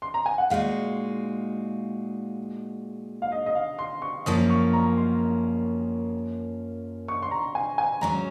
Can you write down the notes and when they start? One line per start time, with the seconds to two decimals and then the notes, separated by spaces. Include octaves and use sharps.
0.02 C6
0.14 A#5
0.26 G#5
0.38 F#5
0.50 A#2 G#3 D#4 F#4 F5
3.22 F5
3.32 D#5
3.46 D#5
3.55 F5
3.79 C6
4.02 C#6
4.26 F#2 F3 A#3 C#4 D#6
4.50 C#6
4.73 A#5
4.97 C6
7.08 C#6
7.22 C6
7.31 A#5
7.55 G#5
7.78 G#5
8.01 G#2 F#3 C#4 A#5